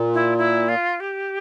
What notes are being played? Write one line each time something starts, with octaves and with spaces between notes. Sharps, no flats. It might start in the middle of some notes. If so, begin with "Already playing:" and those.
Already playing: A#2
E4
E4
F4
G4